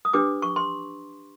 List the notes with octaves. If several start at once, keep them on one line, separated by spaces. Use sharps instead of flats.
D#6
D4 G4 B4 D6
C#6
C6